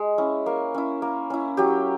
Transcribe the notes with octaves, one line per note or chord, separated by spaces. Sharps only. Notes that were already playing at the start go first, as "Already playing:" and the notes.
Already playing: G#3
C#4 E4
A#3
C#4 E4
A#3
C#4 E4
F#3 G4